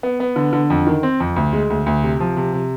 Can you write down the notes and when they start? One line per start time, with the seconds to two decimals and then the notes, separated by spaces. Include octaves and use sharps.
0.03 B3
0.20 B3
0.36 D3
0.53 D3
0.70 F2
0.87 D#3
1.03 C4
1.20 F2
1.36 D2
1.53 G#3
1.70 D2
1.86 D2
2.03 C3
2.20 F3
2.37 C3
2.53 C3